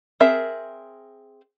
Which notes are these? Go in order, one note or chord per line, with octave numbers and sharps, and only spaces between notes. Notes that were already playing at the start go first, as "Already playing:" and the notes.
C4 G#4 A#4 E5